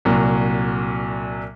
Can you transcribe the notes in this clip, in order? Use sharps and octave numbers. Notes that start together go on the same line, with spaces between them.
C2 A#2 F#3